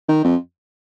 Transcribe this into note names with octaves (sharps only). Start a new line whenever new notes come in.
D#3
F2